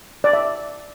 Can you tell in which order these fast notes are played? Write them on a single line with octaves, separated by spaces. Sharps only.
D5 D6 E5